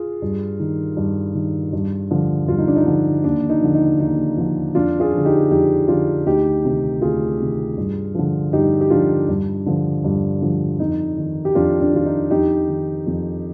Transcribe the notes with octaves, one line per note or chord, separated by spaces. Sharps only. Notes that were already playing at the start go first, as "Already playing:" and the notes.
Already playing: F4 G#4
G2
D#3
G2
D#3
G2
D3 F3
G2 F4
D#4
D4
D#4
D3 F3
D#2 D4
D#4
D3 F3
D#4
D#2 D#4
D3 F3
F2 D4 F4
F4 G#4
D3 F3
D#4 G4
F2 D#4 G4
D3 F3 D4 F4
D2 D#4 G4
C3 D#3
D2 F4 G#4
C3 D#3
G2
D3 F3
G2 D#4 G4
G4
D3 F3 D4 F4
G2
D3 F3
G2
D3 F3
F2 D#4
D#3
G4
F2 D4 F4
D4
D#3 F4
D#4
F2 D#4 G4
D#3
F2